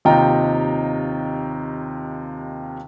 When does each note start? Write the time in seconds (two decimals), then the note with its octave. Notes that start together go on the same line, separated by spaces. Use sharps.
0.05 D#2 C3 D#4 F4 G5 A#5